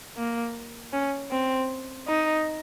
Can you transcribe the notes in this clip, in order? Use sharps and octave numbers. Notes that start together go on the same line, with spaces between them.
A#3
C#4
C4
D#4